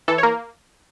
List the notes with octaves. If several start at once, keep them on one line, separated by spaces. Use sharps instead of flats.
E3 A4
C#5
A#3 A#4